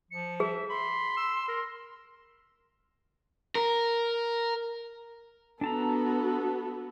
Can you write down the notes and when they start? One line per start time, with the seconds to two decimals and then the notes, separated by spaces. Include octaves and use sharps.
0.11 F3 C#7
0.40 G#4 E5
0.70 B5 C6
1.17 E6
1.48 A#4
3.55 A#4
5.61 B3 D4 F#4 A4 A5 A#5